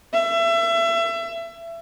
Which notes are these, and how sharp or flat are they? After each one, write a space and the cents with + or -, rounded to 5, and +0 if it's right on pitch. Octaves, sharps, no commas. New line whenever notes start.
E5 +30